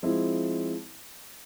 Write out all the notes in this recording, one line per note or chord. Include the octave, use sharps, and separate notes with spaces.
F3 G#3 C4 E4